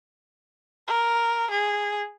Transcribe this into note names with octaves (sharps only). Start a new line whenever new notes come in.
A#4
G#4